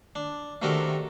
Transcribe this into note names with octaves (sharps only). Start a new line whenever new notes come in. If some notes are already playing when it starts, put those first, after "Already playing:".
D4
C3 D#3 A3 D4 F#4 A#4